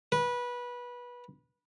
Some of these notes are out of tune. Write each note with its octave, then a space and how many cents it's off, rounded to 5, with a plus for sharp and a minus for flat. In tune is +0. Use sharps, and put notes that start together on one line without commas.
B4 -20